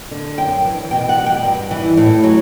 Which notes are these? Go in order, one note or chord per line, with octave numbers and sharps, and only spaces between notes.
D3
F#2 G5
E3
B2 G5
F#5
G3
G5
G2
E3
A2
F#3